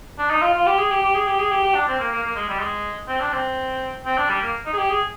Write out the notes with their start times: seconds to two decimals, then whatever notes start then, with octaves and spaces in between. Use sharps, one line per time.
0.18 D4
0.30 D#4
0.42 F4
0.54 F4
0.66 G4
0.78 G#4
0.91 G4
1.03 G4
1.15 G#4
1.27 G4
1.39 G#4
1.51 G4
1.64 G4
1.75 D4
1.88 C4
1.99 A#3
2.12 A#3
2.23 A#3
2.36 G#3
2.48 G3
2.59 G#3
3.08 C4
3.20 D4
3.33 C4
4.05 C4
4.17 D4
4.29 G3
4.41 A#3
4.66 D#4
4.73 G#4
4.78 G4
4.90 G#4